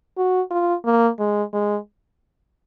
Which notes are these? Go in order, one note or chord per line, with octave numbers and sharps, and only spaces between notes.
F#4
F4
A#3
G#3
G#3